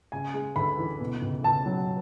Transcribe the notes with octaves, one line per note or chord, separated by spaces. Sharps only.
C#3 G#5
G#3
D2 B5
E3
B2
C#2
C#2 A5
F#3